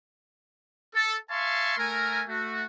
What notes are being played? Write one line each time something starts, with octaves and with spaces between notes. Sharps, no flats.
A4
E5 F5 G#5 A5 C6 C#6
A3 A#4 G#5
A3 F#4